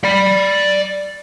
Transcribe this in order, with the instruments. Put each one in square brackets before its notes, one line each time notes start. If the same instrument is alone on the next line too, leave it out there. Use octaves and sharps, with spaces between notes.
[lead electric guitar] D5 B5